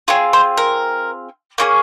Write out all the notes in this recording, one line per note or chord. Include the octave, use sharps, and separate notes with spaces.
C4 F4 G#4 C#5
C5
A#4
A#3 C#4 F4 G#4